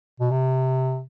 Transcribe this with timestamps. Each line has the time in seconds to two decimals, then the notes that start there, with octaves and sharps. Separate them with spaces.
0.20 B2
0.31 C3